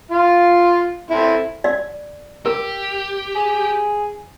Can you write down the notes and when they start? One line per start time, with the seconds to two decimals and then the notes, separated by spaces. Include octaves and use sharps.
0.11 F4 F5
1.10 C4 E4 A4
1.64 D5
2.46 G4 A#4
3.35 G#4